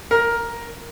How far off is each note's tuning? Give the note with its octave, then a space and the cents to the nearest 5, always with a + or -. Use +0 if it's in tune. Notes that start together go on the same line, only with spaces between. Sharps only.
A#4 +10